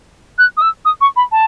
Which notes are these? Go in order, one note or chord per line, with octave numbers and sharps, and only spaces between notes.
F#6
D#6
E6
D#6
C#6
B5
A5